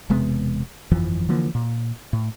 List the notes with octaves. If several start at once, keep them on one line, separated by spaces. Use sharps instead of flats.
E1 C3 G#3 B3
G1 F2 E3 F3
D3 E3 F3 A#3
A#2
A2